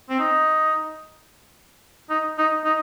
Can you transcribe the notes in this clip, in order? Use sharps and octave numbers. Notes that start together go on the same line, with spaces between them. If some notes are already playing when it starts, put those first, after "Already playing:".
C4
D#4
D#4
D#4
D#4